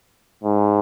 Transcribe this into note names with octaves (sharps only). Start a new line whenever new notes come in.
G#2